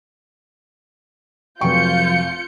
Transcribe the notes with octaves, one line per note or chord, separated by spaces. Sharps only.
F1 F3 F#3 F4 G5 C#6 G6 C#7